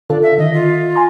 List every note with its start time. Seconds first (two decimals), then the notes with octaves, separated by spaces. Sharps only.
0.10 D3 D4 F4 A4
0.23 E5
0.38 D#3 D#5
0.54 F4
0.96 G#5 A#5 C6